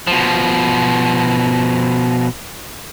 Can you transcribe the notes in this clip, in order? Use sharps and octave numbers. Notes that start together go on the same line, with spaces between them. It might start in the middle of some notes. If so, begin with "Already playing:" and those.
B2 F3